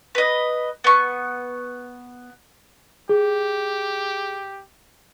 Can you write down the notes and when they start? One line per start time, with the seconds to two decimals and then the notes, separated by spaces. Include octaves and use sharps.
0.15 B4 D#5
0.84 B3 C#6
3.09 G4 G#4